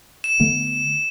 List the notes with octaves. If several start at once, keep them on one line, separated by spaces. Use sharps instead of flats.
E7
D3 A3 B3